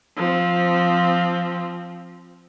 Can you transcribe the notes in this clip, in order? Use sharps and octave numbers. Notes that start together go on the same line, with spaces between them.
F3 C4